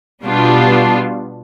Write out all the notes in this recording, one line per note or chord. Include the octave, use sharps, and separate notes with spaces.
B2 G3 B3 D4 F4